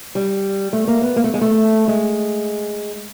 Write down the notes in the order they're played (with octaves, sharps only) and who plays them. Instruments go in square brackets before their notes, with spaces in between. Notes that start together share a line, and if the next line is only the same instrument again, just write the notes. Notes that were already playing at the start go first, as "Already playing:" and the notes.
[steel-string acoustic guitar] G3
A3
A#3
B3
A#3
A3
G#3
A3
G#3